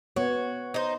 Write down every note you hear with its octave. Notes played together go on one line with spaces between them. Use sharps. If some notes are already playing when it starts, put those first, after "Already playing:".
B3 F#4 C#5
D#4 C5